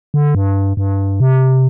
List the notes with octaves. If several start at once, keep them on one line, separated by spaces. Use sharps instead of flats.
D3
G2
G2
C3